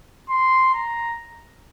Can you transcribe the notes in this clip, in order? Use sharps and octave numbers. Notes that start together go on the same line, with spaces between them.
C6
A#5